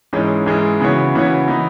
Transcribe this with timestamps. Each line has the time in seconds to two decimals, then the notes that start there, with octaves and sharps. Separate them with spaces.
0.13 G#2 E3 G#3 C#4
0.46 G#2 E3 G#3 C#4
0.81 C#3 E3 B3 F#4 C#5
1.15 C#3 E3 B3 F#4 C#5
1.48 E3 B3 D#4